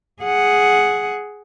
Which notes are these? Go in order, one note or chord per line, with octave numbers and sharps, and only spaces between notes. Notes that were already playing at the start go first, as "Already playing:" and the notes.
G#4 F#5